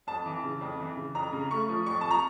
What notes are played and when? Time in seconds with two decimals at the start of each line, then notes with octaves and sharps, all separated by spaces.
0.07 F2 A5
0.26 E3
0.44 C#3
0.61 F2
0.80 E3
0.97 C#3
1.15 F2 A#5
1.33 C#3
1.51 A3 C#6
1.69 F3
1.86 F2 C#6
2.01 F3 A5
2.11 A#5